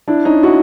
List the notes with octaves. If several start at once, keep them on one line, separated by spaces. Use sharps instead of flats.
D4 E4
C#4 D#4
E4 F#4